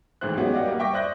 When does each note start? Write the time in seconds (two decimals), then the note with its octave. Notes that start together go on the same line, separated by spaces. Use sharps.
0.21 G#1 A2 E3 G#4 C5 F#6
0.37 F#3 G#3 B3 C#4 F#4 G4
0.53 G4 D5 D#5 F5 F#5
0.66 G3 A#3
0.79 E5 G5 C#6 D6 A#6
0.93 C5 D5 D#6 F#6 G6 A#6